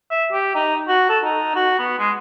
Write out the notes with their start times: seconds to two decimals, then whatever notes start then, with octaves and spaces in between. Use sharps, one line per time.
0.11 E5
0.32 G4
0.55 D#4
0.88 F#4
1.09 A4
1.24 D#4
1.55 F#4
1.79 B3
1.98 G#3